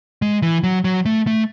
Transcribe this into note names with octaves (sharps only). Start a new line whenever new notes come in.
G#3
E3
F#3
F#3
A3
A3